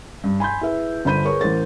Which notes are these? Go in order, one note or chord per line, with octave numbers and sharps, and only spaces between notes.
G2
G#5 B5 C6 G6
E4 G#4 B4 E5
G1 D3 C5 B5 G6 D#7
G#4 A#4 B4 C#5 C#6
A1 A#4 C5 A6